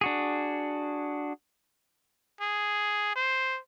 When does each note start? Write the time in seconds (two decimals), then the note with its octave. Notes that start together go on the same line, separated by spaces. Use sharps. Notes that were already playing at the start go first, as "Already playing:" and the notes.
0.01 D4 F#4 G#4
2.41 G#4
3.16 C5